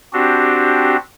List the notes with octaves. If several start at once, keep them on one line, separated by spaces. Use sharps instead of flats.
C4 D4 F#4 G4